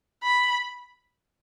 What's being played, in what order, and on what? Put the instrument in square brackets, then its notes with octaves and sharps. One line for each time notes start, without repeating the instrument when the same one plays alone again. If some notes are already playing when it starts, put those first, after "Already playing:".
[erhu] B5